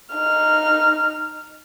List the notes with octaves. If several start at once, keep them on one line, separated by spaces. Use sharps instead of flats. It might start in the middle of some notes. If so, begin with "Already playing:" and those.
D#4 F6